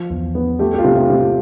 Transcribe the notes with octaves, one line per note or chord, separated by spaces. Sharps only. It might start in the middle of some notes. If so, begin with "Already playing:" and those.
Already playing: F3
E2
B3
A3 G4
G4
F4
C3
F4
C3
F4